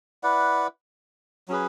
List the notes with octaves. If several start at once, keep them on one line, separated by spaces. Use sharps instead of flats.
E4 B4 D5 F#5
F#3 C#4 G#4 B4